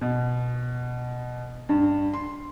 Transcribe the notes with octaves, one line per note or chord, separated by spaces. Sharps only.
B2
G2
C6